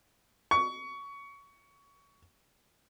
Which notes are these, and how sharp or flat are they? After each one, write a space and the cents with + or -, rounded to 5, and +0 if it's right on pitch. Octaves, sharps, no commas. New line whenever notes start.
C#6 +20